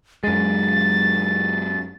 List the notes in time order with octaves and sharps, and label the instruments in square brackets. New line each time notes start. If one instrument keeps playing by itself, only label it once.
[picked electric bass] F#2 G#3 [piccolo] A6